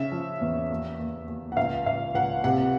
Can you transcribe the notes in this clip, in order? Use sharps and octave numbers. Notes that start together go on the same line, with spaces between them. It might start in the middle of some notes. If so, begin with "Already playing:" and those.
Already playing: C#3 E5
F3
E2
D#2
D#2
D#2
F#5
C#2 F5
C#2 F5
C#2 F#5
C3 F#5